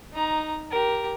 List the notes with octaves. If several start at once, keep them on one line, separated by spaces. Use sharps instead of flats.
D#4 A#5
G4 A#4